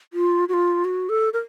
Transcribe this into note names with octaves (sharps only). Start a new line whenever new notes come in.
F4
F#4
F4
F#4
A4
A#4